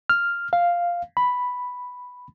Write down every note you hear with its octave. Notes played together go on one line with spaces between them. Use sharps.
F6
F5
B5